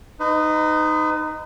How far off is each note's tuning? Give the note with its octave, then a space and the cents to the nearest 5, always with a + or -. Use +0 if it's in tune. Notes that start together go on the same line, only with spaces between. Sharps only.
D#4 -5 B4 +35